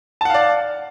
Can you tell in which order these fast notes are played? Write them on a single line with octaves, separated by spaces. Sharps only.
A5 F#5 F5 D5